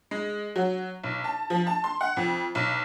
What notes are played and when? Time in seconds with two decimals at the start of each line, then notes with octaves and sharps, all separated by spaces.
0.11 G#3
0.56 F#3
1.04 B1
1.24 A5
1.50 F3
1.67 A5
1.84 C6
2.01 F#5
2.17 F2
2.55 B1